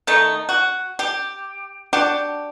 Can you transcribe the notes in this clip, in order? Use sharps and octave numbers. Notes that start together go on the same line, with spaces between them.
D#3 A3 D#4
F#4
G4
D4 F#4 G4